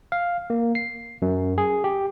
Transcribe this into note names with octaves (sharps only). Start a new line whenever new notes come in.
F5
A#3
C7
F#2
G#4
G4